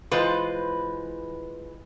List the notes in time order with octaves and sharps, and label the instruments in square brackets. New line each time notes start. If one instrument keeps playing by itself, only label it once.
[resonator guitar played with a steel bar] E3 G#3 F4 B4 C5